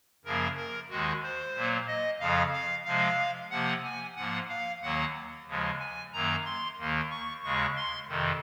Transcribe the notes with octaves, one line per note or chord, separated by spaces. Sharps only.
F#2 C#3 F3 A#3 A#4
A#4
D#2 D#3 G#3 F#4
C5
A#2 F#3 A#3
D#5
F2 C#3 F3 F5
F5
C3 F3 G#3 F5
C3 F3 A#3 F#5
G#5
G#2 F3 A#3 F#5
F5
D#2 D#3 F#3 A#3 F#5
D#2 C#3 F3 G#3
G#5
F#2 D#3 F#3 A#3 A#5
C6
D#2 D#3 A#3
C#6
D#2 C#3 G#3 C#6
C6
F2 C3 D#3